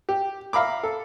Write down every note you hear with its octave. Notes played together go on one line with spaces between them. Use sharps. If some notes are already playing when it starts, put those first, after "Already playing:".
G4
E5 F5 A#5 B5 D6
A4